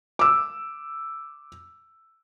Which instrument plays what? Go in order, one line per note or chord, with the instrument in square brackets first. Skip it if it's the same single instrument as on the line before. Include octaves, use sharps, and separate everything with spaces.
[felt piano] D6 E6